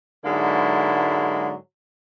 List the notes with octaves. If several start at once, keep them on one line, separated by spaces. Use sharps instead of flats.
G#2 D3 F#3 G#3 A#3 E4